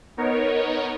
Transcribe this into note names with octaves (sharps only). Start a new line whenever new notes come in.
B3 D#4 A#4 C#5